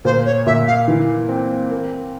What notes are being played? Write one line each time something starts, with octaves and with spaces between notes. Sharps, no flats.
A#2 C5
C#5
A#2 E5
F5
E3
C4
A#3